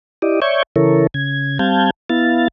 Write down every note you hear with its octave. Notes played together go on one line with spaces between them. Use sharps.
E4 G4 D5 D#5
C#5 D5 E5 C#6 G6 G#6
C#3 E3 E4 A4 A#4 C#5
C#3 G#6
G3 C4 F5 A5 G6 G#6
B3 E4 F5 A6